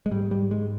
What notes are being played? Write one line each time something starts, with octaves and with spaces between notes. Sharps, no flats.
G#3
G#2 G3
G3
G#3